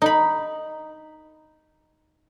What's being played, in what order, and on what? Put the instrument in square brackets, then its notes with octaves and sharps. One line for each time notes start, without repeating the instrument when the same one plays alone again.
[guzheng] D#4 B5